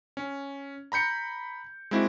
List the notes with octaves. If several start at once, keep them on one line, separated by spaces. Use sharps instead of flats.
C#4
A#5 B5 G6 C#7
G#3 A#3 C4 E4 F#4